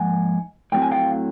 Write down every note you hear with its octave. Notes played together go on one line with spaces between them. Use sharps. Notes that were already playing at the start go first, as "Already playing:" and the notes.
Already playing: G#2 F3 A#3 F#5 G#5
A2 F#3 A3 C4 G5
G#5
F5 G5